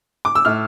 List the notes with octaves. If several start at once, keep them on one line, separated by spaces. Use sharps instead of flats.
D6
E6
A2 F6